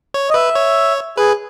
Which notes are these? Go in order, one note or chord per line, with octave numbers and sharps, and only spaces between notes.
C#5
D#5
B4 E5
C#5
G#4 B4